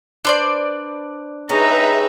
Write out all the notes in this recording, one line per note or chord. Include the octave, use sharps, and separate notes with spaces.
D4 B4 C5 D5
G#3 C#4 D#4 G4 B4 E5 A#5